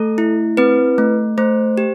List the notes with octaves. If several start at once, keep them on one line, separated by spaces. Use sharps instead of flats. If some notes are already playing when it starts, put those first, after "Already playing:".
Already playing: A3 A4
E4
C4 B4
A3
A3 C5
G4